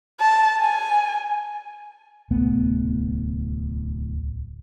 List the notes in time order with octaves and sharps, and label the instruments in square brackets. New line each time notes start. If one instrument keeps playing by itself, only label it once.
[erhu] A5
G#5
[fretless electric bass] D1 C2 A3 B3